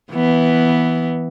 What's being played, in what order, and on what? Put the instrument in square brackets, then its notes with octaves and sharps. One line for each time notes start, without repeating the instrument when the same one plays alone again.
[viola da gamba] E3 B3